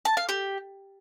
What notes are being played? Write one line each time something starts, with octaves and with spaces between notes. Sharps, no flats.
A5
F5
G4